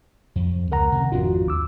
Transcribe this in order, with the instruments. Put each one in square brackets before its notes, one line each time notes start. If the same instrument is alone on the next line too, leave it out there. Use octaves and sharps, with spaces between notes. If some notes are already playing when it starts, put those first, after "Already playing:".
[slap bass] F2
[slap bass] C#2 [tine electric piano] A#4 F#5 A#5
[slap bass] C3 D#3
[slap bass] G#1 F2 D4 [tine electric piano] F4 F#4
[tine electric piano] D#2 D6 E6